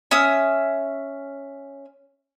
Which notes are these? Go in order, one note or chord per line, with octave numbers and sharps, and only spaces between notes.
C#4 E5 D#6 F6